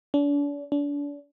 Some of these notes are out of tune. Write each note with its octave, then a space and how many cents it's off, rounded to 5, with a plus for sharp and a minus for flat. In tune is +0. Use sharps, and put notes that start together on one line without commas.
D4 -40
D4 -35